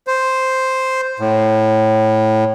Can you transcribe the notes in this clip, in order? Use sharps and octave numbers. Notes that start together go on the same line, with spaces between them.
C5
A2